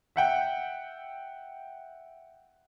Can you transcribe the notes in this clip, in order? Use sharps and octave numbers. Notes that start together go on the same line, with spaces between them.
E5 F#5 G5